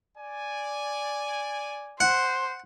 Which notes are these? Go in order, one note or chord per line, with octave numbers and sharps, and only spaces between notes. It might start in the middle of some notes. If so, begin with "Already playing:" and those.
D5 G#5
C5 F#5